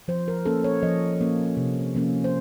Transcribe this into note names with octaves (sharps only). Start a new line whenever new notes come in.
F3 C5
A#4
A#3 C#4 A4
C#5
F3 D#5
A#3 C#4
C3
F3 A#3 C#4
C5